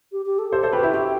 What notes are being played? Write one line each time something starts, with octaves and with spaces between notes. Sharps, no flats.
G4
G4
A4
G4 A4 C5
A4 C5
F#4 G4 B4
E4 G4
E4 G4